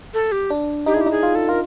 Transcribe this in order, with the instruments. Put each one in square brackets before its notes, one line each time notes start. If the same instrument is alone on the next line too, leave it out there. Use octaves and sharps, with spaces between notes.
[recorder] A4
G4
[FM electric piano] D4
[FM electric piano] D#4 [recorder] G4
[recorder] G#4
[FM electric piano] E4 [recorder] G4
[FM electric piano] D#4
[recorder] G#4
[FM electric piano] F4
[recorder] A4
[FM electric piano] F4 [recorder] A#4